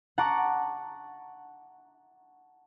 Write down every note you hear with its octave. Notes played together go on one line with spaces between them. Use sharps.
F#5 A5 A#5 C#6 D6 A#6